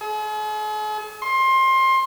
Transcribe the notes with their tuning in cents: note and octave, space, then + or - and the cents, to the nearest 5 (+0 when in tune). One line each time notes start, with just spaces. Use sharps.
G#4 +45
C6 +25